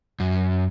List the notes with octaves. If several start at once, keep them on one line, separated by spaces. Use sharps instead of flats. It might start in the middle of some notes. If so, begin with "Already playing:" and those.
F#2